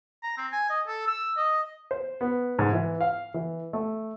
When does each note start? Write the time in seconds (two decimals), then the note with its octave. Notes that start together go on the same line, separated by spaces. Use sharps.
0.23 A#5
0.38 C4
0.52 G#5
0.70 D#5
0.87 A4
1.07 E6
1.37 D#5
1.91 C5
2.21 B3
2.59 G#2
2.73 E3
3.01 F5
3.34 E3
3.73 A3